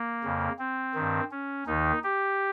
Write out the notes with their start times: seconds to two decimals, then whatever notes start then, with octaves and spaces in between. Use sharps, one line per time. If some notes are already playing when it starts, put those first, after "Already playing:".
Already playing: A#3
0.24 F2 C#3
0.59 C4
0.95 G2 D#3
1.31 C#4
1.67 D#2 D#3 D#4
2.04 G4